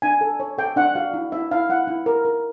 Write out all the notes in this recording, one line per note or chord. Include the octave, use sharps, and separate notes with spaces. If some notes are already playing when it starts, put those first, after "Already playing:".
D4 G#5
A4
C#5
A4 G5
D4 F#5
F#4 F5
E4
E4 E5
E4 F5
E4 F#5
E4
A#4
A#4